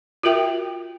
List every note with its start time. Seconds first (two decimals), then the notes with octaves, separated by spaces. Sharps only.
0.23 F4 F#4 A#4 E5 G5